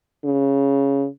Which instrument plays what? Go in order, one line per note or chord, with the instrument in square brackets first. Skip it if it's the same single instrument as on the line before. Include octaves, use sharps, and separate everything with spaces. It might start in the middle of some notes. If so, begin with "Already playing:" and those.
[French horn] C#3